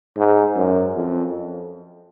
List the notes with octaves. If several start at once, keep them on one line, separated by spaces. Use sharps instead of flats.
G#2
F#2
F2